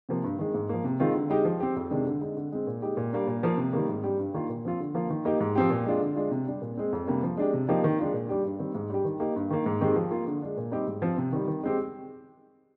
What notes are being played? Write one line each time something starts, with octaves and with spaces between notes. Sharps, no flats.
C3 F3 A#3
G2
D#3 G#3
G#2
F3 A#3
C3
D#3 G#3 C4 F4
D3
G#3 D#4 G4
F3
C4 G4
F2
C3 D#3 G#3 D4
D3
G#3 D#4
D3
G#3 C4
A#2
G#3 D#4 G4
A#2
G3 A#3 D4
A#2
F3 A#3
C3
D#3 G3 A#3
G#2
G3 D4 G4
G2
D#3 A#3 F4
A#2
F3 C4 F4
D3
F3 A#3 F4
D#3
A#3 D#4 G4
G#2
F3 C4 G4
A#2
G#3 D4 F4
D3
G#3 D4 F4
C3
G3 D4 G4
A#2
G#3 C4
F2
C3 G3 A#3 D4
F3
G#3 D4 G4
C3
F3 A#3 D#4 G4
D#3
G#3 D4 F4
A#2
G3 D4 G4
G2
D#3 G3 C4
G#2
G3 D4 G4
D#3
A#3 D#4 G4
G2
D#3 A#3
G#2
D#3 G#3 C4 G4
F3
A#3 F4
D3
G#3 D4
A#2
G3 C4 D#4 G4
G#2
F3 C4
C3
D#3 G3
D#3
G#3 C4 G4